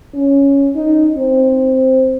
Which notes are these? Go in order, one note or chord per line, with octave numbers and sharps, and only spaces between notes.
C#4
D#4
C4